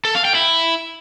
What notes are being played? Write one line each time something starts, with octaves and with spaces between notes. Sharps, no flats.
A4
F5
G5
E4